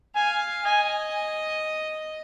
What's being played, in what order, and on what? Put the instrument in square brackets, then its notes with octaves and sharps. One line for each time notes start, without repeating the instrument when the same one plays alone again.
[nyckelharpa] F5 [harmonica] G#5
[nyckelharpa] D#5 [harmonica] G#5